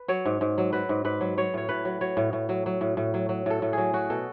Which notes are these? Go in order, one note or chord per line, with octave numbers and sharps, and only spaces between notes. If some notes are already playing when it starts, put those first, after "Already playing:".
Already playing: B4
F#3 C#5
G#2
G#2
F#3
F#3 B4
G#2
G#2 B4
F#3
F#3 C#5
A2 C#5
A2 B4
F#3
F#3 C#5
A2
A2
F#3
F#3
A2
A2
F#3
F#3
A2 A4
A2
F#3 G#4
F#3 F#4
B2 A4